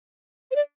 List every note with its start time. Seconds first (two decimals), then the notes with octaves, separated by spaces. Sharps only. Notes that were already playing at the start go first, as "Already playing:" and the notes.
0.51 C5
0.56 D5